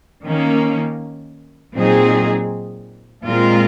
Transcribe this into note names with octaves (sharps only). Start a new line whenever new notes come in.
D#3 A#3 C#4
A#2 F#3 C4 D#4 G#4
A#2 G#3 C4 F4 A#4